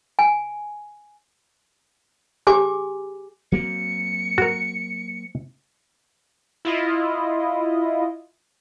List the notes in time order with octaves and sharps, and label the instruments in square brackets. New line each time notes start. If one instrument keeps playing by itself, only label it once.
[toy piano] G#5
G4 G#4 G#5 D6
[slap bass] F#3 A#3 C4 [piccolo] C#7
[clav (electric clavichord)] F#4 A#4
[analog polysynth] E4 F4 D#5